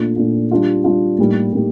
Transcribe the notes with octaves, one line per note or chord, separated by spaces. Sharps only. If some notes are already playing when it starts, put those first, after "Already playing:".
Already playing: A#2 A3 D4 F4
A#2 A3 D4 F4
G3 D4 F4
G3 D4 F4
A2 G3 A#3 D#4 G4
A2 G3 A#3 D#4 G4